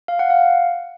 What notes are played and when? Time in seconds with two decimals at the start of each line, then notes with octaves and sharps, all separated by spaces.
0.08 F5
0.19 F#5
0.30 F5